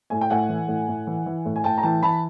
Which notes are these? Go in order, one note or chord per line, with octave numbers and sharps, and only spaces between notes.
A2 G#5
G5
A2 F#5 G#5
E3
A2
A2
E3
E3
A2
G#5
A2 G5 A5
A#5
E3 G5 A5
E3 A5 B5